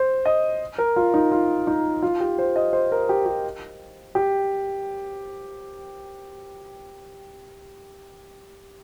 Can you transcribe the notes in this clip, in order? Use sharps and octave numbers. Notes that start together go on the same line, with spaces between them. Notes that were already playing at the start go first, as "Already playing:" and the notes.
Already playing: C5
D#5
A#4
F4
D#4
F4
D#4
F4
G4
C5
D#5
C5
A#4
G4
G4
G4